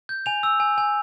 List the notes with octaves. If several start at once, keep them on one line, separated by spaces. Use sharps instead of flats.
G6
G#5 F7
E6
G#5
G#5